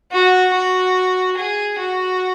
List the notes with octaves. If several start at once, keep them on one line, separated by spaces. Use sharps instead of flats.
F#4
F#4
G#4
F#4